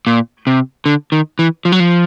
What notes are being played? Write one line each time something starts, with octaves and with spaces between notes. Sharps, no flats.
A#2
C3
D3
D#3
E3
F3
F#3
F3